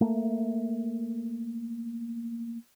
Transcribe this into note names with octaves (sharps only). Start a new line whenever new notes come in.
A3 A#3